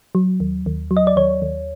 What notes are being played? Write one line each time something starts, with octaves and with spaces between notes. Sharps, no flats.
F#3
D#2
D#2
F#3
D#5
D5
D#2 C#5
D#2